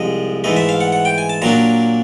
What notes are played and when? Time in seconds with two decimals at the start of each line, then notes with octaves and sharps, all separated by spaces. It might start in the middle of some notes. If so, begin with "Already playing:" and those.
Already playing: C2 C3 F3 G#3 D#5
0.44 G#2 E3 A3 D#5
0.56 E5
0.69 F5
0.81 F#5
0.92 F#5
1.05 G5
1.18 G#5
1.30 A5
1.42 A#2 F#3 A#3 D4 A#5